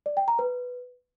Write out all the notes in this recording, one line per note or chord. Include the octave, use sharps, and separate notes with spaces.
D5
G5
A#5
B4